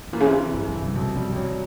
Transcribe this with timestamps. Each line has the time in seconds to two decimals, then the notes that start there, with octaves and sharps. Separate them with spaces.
0.07 A2
0.13 A#2 E3
0.20 C#3
0.26 C3
0.33 E3
0.54 G1 G3
0.68 G3
0.74 C3
0.81 F#3
0.95 B1 G3
1.15 F3 G3
1.36 E3 F#3